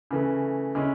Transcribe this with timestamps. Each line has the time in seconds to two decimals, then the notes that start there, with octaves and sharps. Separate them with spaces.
0.11 C#3 E3 A3
0.75 C#3 G#3 C#4 E4